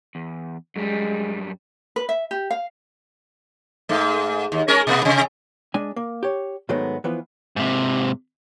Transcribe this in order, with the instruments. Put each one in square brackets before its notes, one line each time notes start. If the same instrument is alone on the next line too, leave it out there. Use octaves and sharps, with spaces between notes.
[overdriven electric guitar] E2
[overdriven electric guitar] F#2 G3 [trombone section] G#3
[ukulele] B4
E5
G4
F5
[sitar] G#2 A3
D#2
G#3 C#4 A#4
B2 A#3 B3
C3
[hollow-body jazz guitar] G#3 D4 G#5
A#3
G4 C#5
G#2 D#3 F#3 G#3 A3 B3
E3 F3 B3
[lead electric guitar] G#2 C3